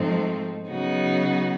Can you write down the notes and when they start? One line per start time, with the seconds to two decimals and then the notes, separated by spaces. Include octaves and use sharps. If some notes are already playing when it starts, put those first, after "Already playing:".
Already playing: G#2 F3 A3 C4 D#4
0.68 C#3 F#3 B3 D#4 F#4